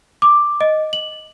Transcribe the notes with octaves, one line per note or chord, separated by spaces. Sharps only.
D6
D#5
F#7